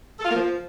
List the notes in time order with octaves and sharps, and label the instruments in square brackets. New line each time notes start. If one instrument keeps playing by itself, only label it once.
[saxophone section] A4
F4
A#3
F3